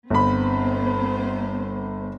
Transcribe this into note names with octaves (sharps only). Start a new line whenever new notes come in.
G1 B3 C4 C5 B5